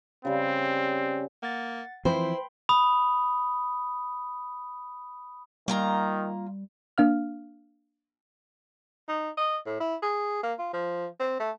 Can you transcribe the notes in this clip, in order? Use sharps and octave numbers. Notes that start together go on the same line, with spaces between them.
C#3 G3 C4
A#3 F#5 A6
E3 F3 C4 E4 C5 G5 B5 C6
B5 D#6
D#3 G3 A#3 F4 A#5
A#3 D4 F5 F6
D#4
D#5
A2
E4
G#4
A#3
F4
F3
C4
A3